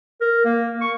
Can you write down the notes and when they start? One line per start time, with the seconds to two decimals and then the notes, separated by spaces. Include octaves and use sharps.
0.21 A#4
0.45 A#3
0.81 C#6